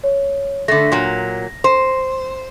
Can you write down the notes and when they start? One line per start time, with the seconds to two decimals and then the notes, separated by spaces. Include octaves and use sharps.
0.04 C#5
0.68 D3 A3 A#6
0.92 A#2 F#3
1.64 C5